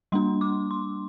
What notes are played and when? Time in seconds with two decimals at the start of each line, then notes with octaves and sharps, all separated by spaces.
0.12 G3 A#3 D4 C6
0.41 D6
0.71 C6